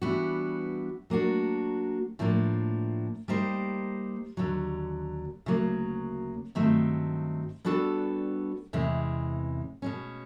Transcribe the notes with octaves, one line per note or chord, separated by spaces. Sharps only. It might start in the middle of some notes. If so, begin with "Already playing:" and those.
E3 G3 B3 D4 F#4
F#3 A#3 D4 F#4
A2 F3 A#3 D4
G3 A#3 D#4 G4 C5
D#2 D3 F#3
D2 C#3 F#3 A#3
G2 D#3 F#3 A3 C4
G3 B3 D4 F#4 A4
E2 C3 E3 G#3 C#4
B2 G#3 C#4